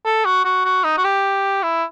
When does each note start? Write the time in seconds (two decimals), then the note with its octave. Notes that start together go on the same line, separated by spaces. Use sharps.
0.05 A4
0.25 F#4
0.44 F#4
0.65 F#4
0.84 D#4
0.98 F#4
1.04 G4
1.63 E4